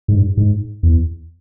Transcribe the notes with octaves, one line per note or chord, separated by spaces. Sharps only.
G#2
G2
G#2
E2